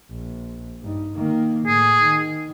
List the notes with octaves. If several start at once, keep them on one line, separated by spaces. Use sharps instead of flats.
A#1
G2 D#4
D#3 A#3
A2 G#4
D#3